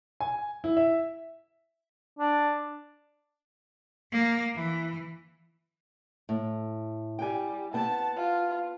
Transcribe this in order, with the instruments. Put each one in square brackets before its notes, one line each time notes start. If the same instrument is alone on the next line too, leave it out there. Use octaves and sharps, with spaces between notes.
[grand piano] G#5
E4
E5
[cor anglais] D4
[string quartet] A#3
E3
[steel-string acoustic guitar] A2
[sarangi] G3 [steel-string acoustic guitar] G5 G#5
[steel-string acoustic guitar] B3 C4 [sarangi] A5
[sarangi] F4